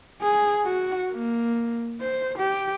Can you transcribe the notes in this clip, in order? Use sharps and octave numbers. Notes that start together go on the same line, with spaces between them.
G#4
F#4
A#3
C5
G4